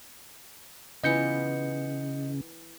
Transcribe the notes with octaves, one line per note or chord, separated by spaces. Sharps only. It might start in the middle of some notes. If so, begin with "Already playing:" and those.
C#3 E3 B3 F4 D#5 G6 C#7